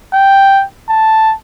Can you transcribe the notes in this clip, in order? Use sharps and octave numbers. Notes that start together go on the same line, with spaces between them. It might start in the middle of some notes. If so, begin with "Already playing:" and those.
G5
A5